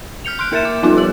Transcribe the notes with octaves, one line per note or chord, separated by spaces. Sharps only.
F6 G6 C#7 F7
C6 F6 F#6 D7
A#3 A#4 E5 A6 E7
D6
F3 G3 B3 D#4 F4 A4
G4 F#7